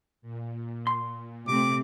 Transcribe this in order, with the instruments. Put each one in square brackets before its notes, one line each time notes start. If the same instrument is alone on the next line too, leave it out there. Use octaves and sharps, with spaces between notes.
[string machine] A#2
[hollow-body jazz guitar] C6
[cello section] C3 A3 C4 [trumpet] D6